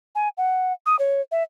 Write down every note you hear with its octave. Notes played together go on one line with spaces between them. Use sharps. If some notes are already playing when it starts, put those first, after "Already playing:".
G#5
F#5
D#6
C#5
E5